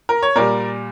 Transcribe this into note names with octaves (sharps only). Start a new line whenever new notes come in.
A#4
C#5
A#2 G3 A#4 D5